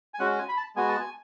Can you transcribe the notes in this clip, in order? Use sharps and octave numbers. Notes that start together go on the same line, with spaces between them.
G#5
G#3 C#4 F#4 F#5
G#5
B5
A5
G#3 B3 F#4 G#5
A5
G#5